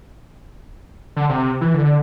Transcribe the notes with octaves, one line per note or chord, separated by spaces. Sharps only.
D3
C3
E3
D3